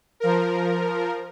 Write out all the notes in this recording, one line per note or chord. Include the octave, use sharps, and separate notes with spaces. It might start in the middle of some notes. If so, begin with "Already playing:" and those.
F3 A#4